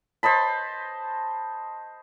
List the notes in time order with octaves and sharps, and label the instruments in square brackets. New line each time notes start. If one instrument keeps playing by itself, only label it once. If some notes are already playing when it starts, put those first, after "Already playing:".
[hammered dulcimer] C5 D#5 A5 B5